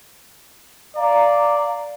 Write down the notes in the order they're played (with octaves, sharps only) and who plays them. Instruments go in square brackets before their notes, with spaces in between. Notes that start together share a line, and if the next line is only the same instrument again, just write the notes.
[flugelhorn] D5 [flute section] F5 A#5